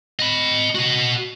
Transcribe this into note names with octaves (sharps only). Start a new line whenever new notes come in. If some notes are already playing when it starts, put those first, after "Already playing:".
D#5 B5
F#4 D#5